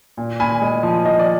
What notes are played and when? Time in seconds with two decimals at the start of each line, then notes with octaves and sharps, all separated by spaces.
0.17 A#2
0.40 A#2 G#5 B5
0.62 G#3
0.83 F3
1.05 F3 D#5
1.19 D5